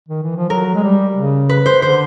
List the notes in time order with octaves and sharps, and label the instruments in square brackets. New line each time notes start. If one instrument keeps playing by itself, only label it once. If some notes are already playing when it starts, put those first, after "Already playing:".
[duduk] D#3
E3
F3
[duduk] F#3 [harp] A#4
[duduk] G#3
G3
C#3
[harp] B4
C5
[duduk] D3 [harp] C5